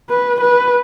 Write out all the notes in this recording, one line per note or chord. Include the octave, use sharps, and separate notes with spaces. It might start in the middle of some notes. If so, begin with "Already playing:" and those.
B4
B4